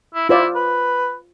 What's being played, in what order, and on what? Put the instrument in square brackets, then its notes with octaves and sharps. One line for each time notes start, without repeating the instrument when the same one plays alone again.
[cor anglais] E4
[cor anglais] E4 [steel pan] F4 C5 D5
[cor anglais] B4